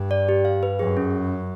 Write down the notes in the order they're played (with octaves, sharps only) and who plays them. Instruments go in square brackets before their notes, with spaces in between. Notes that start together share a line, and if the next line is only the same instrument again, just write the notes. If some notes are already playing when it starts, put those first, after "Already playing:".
Already playing: [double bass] G2
[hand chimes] D5
G4
F5
B4
[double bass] F#2 [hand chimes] G#4
[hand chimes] C#4